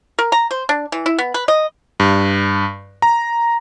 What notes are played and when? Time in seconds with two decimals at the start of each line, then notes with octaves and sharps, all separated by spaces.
0.19 A#4
0.32 A#5
0.51 C5
0.69 D4
0.92 E3
1.06 E4
1.18 B3
1.34 B4
1.48 D#5
2.00 G2
3.02 A#5